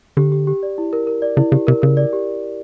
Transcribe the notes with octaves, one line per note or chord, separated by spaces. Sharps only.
D3 G4
G4
G4
D5
E4
A#4
A#4
D5
C#3 E4
C#3 G4
C3 A#4
C#3 A#4
D5
G4